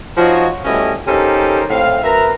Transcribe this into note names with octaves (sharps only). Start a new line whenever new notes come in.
F3 D#4 F4 F#4 C#5 D#5
B2 G3 A3 C#4 E4 D#5
C#4 D#4 G4 A4 A#4 C5
A2 C4 E4 F5
F#2 A#4 B4 E5 A#5